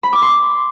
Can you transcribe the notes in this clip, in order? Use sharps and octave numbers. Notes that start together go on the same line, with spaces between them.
B5
D6
C6